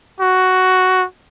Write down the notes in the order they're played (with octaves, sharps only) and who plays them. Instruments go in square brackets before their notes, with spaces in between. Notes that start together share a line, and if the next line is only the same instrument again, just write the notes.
[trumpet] F#4